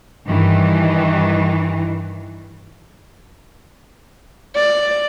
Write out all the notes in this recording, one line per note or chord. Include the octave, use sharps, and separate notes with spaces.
G2 D#3 E3
D5